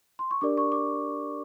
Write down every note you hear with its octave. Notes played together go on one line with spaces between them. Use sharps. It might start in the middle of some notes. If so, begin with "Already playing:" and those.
C6
C#6
D4 G4 A#4 D5 D6
C#6
D6